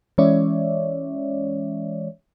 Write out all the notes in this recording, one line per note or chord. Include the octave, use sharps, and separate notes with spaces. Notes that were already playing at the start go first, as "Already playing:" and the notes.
E3 G#3 C#4 C#5 D5 E5